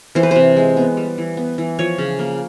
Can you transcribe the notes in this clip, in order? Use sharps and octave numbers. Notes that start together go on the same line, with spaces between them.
E3 C5
B4
C3 C5
G#3
B3
G3
E3
B3
E3
F3 C#5
C#3
A#3